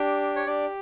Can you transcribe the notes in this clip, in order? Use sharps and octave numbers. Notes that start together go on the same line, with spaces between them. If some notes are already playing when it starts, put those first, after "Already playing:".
Already playing: D4 G4
C#5
D4 G4 D5